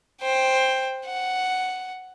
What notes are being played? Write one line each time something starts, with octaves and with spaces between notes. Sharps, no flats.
C5 G5
F#5